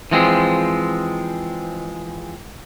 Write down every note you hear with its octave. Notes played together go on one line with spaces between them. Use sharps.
E3 F3 G#3 C4